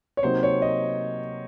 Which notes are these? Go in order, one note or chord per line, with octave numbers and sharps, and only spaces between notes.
C#5
C3 F#3 A#3 D#4 C5
C#5
D#5